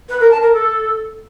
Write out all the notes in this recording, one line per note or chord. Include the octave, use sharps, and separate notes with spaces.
B4
A#4
A5
A#4
A4